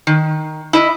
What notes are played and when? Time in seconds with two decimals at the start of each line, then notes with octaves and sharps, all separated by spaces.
0.07 D#3
0.73 E4 D#5